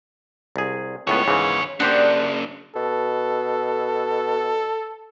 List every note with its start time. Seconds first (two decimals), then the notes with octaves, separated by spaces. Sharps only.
0.56 C2 G#4
1.07 C#2 A2 D#3 B3 C#5
1.28 G#2 C#3 E3
1.80 C#3 A#3 D4 G4 C5 F#5
2.76 B2 A4